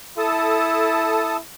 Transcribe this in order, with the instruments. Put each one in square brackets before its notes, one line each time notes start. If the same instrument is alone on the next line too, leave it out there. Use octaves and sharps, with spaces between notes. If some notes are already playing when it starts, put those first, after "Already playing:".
[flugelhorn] E4 [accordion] A4 A5 D#6